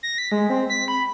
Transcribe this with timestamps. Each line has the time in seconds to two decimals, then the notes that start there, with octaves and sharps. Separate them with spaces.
0.03 A#6
0.18 B6
0.32 G#3
0.50 C4
0.70 B6
0.88 B5